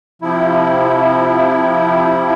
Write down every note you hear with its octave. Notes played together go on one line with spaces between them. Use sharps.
C3 F3 E4